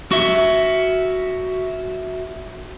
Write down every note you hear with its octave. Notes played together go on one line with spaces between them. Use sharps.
F#4 E5